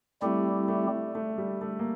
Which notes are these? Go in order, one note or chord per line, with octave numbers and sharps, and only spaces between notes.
G3 A3 C4 E4 G4
A3
A3
G3
A3
A#3